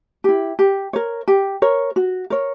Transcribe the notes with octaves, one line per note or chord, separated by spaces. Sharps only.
E4 G4
G4
A#4 C#5
G4
A#4 C#5
F#4
A#4 C#5